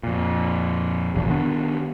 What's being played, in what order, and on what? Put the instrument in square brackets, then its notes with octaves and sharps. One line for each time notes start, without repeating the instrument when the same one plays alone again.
[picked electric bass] F2 A#2
E1 A#1 G2 E3
D#3 B3 D4